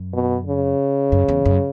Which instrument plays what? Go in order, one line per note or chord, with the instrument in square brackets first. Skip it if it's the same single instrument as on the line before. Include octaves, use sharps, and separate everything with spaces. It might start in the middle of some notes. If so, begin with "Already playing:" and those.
Already playing: [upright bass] F#2
[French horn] B2
C#3
[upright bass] F#2
E2
F#2